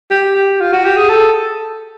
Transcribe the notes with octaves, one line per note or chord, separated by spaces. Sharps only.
G4
G4
F4
F#4
G4
G#4
A4